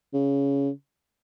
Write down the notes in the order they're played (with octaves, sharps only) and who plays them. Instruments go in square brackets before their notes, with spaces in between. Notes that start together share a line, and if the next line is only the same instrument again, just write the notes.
[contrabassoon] C#3